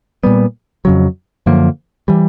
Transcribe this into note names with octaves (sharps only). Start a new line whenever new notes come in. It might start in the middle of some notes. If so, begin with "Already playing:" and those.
A#2 G3 B3
F2 C#3 F#3
F#2 D3 F3 A#3
E3 G3